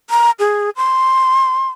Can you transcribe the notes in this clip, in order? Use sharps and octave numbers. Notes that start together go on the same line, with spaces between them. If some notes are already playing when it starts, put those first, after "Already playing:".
A#5
G#4
C6